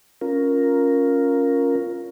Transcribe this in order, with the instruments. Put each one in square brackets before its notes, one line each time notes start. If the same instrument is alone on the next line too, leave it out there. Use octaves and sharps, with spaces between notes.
[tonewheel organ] C#4 F4 A#4